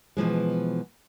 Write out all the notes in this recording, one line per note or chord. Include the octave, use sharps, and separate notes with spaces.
B2 E3 F3 G#3